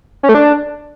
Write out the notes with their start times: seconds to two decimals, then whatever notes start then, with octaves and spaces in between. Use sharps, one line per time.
0.23 C#4
0.29 A3
0.35 D4